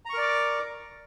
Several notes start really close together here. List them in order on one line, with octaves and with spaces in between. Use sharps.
A#5 C#6 A#4 D5 D6